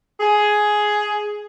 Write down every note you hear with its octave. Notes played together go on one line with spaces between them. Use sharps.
G#4